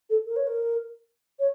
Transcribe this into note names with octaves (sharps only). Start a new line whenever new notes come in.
A4
A#4
C#5
A#4
C#5